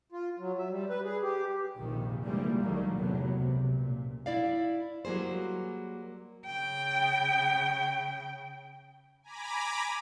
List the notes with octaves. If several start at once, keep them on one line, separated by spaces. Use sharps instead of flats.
F4
F#3
E5
G3
B4
G#4
G4
A#1 F2 C3 D#3
D3 E3 F3 G3 G#3 A#3
A#1 D#3 F#3 G3 A3 A#3
E2 A2 C3 F#3 B3
C#2 C3
A#2
E4 D5 F5
F#3 G3 A#3 G#4 C5
C#3 G5
G#5 A#5 B5 D6